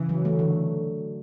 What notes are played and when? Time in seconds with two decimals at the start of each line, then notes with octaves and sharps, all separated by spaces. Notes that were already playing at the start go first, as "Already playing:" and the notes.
Already playing: C#3 E3
0.09 F#3
0.25 A3
0.39 D3